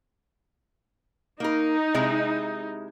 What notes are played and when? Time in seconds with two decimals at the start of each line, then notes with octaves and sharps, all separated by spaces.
1.40 A#3 D#4 A#4
1.94 C3 G#3 E4